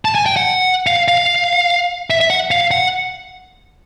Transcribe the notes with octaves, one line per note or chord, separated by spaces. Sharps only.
A5
G#5
G5
F#5
F5
F5
E5
E5
F#5
F5
F#5